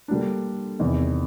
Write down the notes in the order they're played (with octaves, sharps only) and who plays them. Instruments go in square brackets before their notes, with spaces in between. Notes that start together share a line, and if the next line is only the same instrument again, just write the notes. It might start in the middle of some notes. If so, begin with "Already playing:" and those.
[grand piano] D3 G3 A#3 D4
E2 C3 D#3